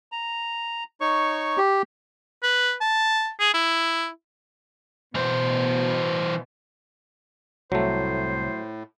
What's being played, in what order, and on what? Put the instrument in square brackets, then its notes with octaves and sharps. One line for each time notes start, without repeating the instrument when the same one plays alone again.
[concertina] A#5
D#4 C#5 C#6
[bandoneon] G4
[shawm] B4
A5
G#4
E4
[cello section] B2 [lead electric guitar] E3 C5
[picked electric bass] C2 [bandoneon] A2 [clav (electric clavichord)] F#3 A3 [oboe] C5